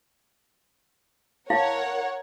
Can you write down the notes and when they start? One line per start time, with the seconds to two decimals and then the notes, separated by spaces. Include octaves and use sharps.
1.50 E4 A#4 C#5 F5 F#5